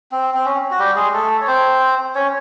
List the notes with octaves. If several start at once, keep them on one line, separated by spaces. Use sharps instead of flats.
C4
C4
C#4
F#4
G3 G4
G#3 G#4
A3 A4
C#5
C4 C5
C#4 C#5